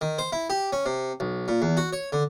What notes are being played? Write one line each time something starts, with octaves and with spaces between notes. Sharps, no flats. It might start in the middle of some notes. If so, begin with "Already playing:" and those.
D#3
C5
E4
G4
C#4
C3
B1
A#2
E2
F#4
C#5
D3